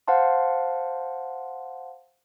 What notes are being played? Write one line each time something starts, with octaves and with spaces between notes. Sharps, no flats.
C5 F5 F#5 A5 C6